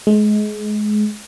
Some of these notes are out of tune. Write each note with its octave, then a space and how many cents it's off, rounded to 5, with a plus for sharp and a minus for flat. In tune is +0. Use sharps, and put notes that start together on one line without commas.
G#3 +25